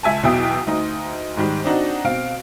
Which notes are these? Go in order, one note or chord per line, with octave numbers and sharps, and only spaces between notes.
C#2 E5 G#5 A5
B1 E2 B2 E5 G5 D#6
D2 D#4
G#2 D#3 G3
C4 D4 D#4 F#4
B2 C4 F5 D7